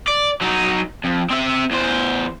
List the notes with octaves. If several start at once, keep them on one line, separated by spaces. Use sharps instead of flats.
D5
F#3 D#4
F2
C4 E5
E2 C5